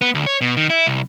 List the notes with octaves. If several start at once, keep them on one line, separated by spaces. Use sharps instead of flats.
B3
D2
C#5
B2
D#3
E4
C2